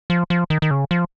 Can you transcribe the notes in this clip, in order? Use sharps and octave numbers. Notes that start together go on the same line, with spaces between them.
F3
F3
D#3
D#3
C#3
F3